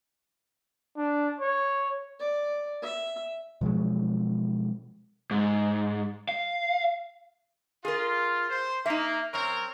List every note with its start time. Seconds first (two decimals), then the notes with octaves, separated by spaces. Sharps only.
0.97 D4
1.40 C#5
2.20 D5
2.82 E5
3.61 B2 F3 F#3 G#3
5.31 G#2
6.29 F5
7.85 F4 G#4 A#4
8.49 C5
8.86 A#3 D#4 E5
9.34 F#2 C4 A#4 C#5